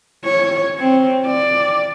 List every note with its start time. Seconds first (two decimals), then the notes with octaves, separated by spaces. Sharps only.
0.24 C#5
0.79 C4
1.26 D5